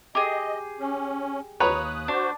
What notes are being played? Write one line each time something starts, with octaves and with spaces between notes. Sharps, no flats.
G4 G#4 D#5
C#4
D#2 B4 C#5 A#5 D#6 F#6
D4 F#4 C5